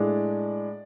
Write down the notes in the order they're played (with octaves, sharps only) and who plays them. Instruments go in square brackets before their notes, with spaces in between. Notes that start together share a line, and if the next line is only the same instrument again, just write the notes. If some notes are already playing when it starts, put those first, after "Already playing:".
Already playing: [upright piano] A2 G#3 D4 D5